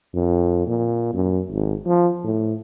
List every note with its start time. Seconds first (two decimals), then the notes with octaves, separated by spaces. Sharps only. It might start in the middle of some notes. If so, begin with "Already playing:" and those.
0.14 F2
0.66 A#2
1.13 F#2
1.51 G#1
1.86 F3
2.24 A2